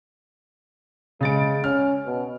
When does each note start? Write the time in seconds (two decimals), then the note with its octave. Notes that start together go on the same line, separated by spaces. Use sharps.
1.21 C#3 G#3 A6 D7
1.64 C#4 F6
2.06 B2